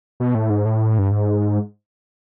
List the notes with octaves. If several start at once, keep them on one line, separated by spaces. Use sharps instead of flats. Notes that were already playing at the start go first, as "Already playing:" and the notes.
B2
A2
G#2
A2
G2
G#2